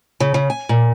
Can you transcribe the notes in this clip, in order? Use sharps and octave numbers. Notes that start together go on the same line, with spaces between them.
C#3
C#3
G#5
A#2